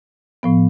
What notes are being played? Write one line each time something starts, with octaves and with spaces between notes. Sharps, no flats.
A2 F3 B3